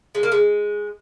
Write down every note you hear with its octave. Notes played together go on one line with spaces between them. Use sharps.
G#3
A#3
G#3